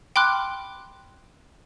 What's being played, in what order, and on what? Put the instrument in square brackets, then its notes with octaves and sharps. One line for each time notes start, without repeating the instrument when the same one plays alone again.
[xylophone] G5 B5 C6 D6 F6 F#6